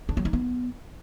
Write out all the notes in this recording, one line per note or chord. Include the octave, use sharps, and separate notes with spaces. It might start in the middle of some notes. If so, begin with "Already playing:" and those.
D4
F#3
D#4
B3